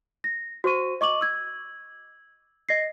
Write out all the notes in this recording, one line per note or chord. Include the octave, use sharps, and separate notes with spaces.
A#6
F#4 C5 C#6 D#7
D#5 C#6 D6 F#7
E6 G#6
D#5 A#6 C7